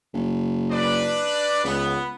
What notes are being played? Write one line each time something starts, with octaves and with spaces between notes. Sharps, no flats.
F#1
D4 B4 D5
C#2 B3